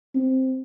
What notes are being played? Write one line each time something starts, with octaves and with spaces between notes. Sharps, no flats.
C4